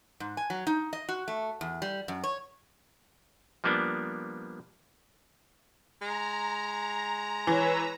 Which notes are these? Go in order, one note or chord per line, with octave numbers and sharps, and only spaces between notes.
G#2
G#5
F#3
D#4
D#5
F#4
A3
E2
G3
F#2
C#5
F3 G3 A#3 B3 D4
G#3 A#5
E3 B4 C#5 E6